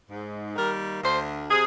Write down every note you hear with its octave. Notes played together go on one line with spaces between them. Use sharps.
G#2
D#3 G3 A#3 A#4
D2 C5
C3 G#4